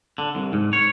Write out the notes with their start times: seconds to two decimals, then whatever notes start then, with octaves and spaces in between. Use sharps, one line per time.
0.18 D3
0.35 C2
0.53 G#2
0.73 C#5